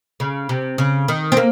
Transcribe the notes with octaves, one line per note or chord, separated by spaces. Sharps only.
C#3
C3
C#3
D#3
C4
A#3